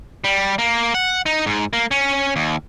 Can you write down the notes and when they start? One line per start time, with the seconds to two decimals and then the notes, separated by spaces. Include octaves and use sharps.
0.24 G3
0.58 A#3
0.95 F#5
1.26 D#4
1.46 G#2
1.73 A#3
1.91 C#4
2.36 D#2